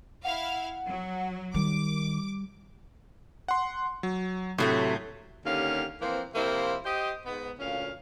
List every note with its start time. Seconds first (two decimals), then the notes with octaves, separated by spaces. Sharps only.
0.24 E4 F5 F#5
0.86 F#3
1.54 D#3 G3 D6
3.48 F#5 C6
4.03 F#3
4.58 A2 C3 F#3 A3
5.46 D#2 D3 C#4 G4 F5
6.01 E3 F3 A#3 C4 C5
6.34 C3 F3 A#3 E4 C5
6.85 G4 C5 D#5
7.26 G#2 B3
7.59 D2 A#2 C#4 F5